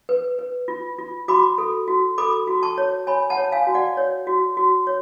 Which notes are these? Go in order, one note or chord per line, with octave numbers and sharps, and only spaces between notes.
B4
B4
F4
F4
F#4 B5 D6
A4
F#4
A4 B5 D6
F#4
A5 C#6
C#5
C#5 G#5 B5
F#5 A5
C#5
F5 G#5
F#4
D5 F#5
C#5
F#4
F#4
C#5